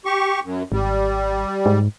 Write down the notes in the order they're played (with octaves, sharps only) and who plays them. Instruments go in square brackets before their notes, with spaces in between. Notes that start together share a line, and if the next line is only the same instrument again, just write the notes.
[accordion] G4 C#6
F#2
[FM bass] G#1 [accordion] G3
[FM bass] G#2